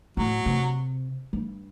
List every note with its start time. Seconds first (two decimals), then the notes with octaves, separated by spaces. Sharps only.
0.17 A2 F#3
0.46 C3
1.33 G2